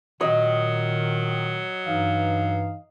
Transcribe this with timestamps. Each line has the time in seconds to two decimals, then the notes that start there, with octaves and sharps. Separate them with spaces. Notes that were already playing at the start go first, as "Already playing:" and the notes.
0.21 A#2 D#3 F#3 D#5
1.86 G2 E3 D#4 F5